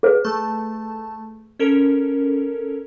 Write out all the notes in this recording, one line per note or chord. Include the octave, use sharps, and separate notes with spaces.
G#4 B4
A3 A5
C#4 A4 A#4